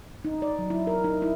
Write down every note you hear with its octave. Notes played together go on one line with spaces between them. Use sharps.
D#4
D5
F#3
E4
A#4
D#4
E4